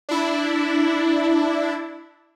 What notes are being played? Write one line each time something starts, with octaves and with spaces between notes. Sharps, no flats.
D4 E4